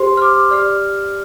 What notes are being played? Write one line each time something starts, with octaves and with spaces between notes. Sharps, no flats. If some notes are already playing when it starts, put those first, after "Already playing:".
Already playing: G4 C5 C6
F6
D6
G4 D5 F6